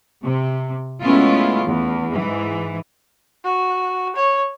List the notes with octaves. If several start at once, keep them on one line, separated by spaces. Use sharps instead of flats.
C3
G#3 A3 B3 C#4 E4 F4
E2
G#2 E3
F#4
C#5